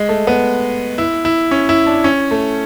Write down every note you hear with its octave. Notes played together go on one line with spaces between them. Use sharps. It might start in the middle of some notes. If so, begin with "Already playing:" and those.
Already playing: G#3
A3
B3
E4
E4
C#4
E4
D4
C#4
A3